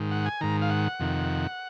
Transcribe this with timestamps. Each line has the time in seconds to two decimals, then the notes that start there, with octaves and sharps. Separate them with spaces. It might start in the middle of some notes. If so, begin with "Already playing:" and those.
Already playing: G#2 D#3
0.11 F#5
0.26 G#5
0.41 G#2 D#3 A#5
0.62 F5
0.70 F#5
1.00 F2 C3 D#3